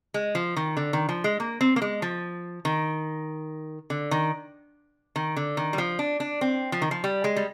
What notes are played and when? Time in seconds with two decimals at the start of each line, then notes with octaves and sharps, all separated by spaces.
0.14 G#3
0.35 F3
0.56 D#3
0.77 D3
0.93 D#3
1.09 F3
1.24 G#3
1.40 A#3
1.61 C4
1.76 A#3
1.82 G#3
2.02 F3
2.65 D#3
3.90 D3
4.11 D#3
5.16 D#3
5.36 D3
5.57 D#3
5.73 G3
5.78 F3
5.99 D4
6.20 D4
6.41 C4
6.72 F3
6.82 D#3
6.91 F3
7.04 G3
7.24 G#3
7.36 G3